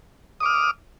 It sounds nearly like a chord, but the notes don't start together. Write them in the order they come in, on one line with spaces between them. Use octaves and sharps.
D#6 D6 F6